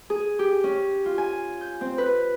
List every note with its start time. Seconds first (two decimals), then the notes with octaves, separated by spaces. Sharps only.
0.10 G#4
0.39 G4
0.64 C#4
1.05 F4
1.18 G#5
1.61 G6
1.81 C4
1.98 B4